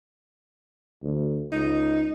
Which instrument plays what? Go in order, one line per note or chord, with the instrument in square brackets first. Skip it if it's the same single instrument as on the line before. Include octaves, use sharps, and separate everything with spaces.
[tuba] D2
[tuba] C#2 [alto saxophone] D#4